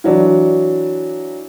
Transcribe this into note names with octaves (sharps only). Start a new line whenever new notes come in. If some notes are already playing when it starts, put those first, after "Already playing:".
E3 F#3 D4